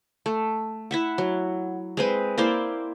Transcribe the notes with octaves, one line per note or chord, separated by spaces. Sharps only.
A3
E4 E5 F#5
F#3
G#3 C4 B4
A#3 E4 C5 D5